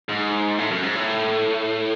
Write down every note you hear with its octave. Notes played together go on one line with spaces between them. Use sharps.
G#2
A2
F#2
G#2
A2